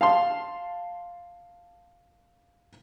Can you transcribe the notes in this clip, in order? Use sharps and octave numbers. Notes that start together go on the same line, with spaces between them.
F5 A5 C6